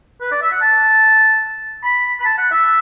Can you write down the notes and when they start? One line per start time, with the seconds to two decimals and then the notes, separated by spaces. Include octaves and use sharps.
0.21 B4
0.32 D5
0.42 E5
0.52 F#5
0.62 A5
1.84 B5
2.20 B5
2.25 A5
2.38 F#5
2.51 E5